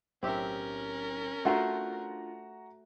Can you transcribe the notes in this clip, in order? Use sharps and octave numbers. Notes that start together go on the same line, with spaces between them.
B1 A2 C4 C#4 G4 A#4 E5
A3 D4 F4 F#4 C5 F#5 A#5